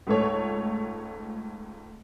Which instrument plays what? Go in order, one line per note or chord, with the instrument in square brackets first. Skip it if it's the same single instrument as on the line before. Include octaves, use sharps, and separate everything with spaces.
[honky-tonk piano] C#2 G#2 A3 A4 C#5